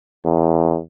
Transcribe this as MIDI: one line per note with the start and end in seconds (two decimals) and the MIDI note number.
0.25 0.79 40